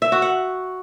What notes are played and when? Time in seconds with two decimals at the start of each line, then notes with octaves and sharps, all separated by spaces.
0.02 E5
0.12 F#4
0.22 F#5